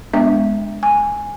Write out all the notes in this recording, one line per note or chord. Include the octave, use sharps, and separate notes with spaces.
G#3 B3 D4 E5
G#5